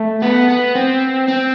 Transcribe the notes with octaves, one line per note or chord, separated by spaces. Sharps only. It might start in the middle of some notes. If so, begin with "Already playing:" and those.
Already playing: A3
B3
B3
C4
C4